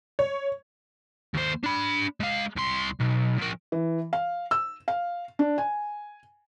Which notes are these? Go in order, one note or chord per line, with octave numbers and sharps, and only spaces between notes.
C#5
D#2 C5
D4 B5
G#3 F5
C2 C6
B1
F3 A#4
E3
F5
E6
F5
D4
G#5